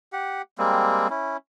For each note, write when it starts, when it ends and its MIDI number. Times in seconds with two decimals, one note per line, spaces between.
0.13 0.42 67
0.13 0.42 78
0.58 1.08 55
0.58 1.08 56
0.58 1.08 58
0.58 1.08 60
1.10 1.37 61
1.10 1.37 64